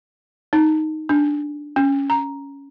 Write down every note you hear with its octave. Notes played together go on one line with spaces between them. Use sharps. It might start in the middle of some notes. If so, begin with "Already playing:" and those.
D#4
D4
C#4
A#5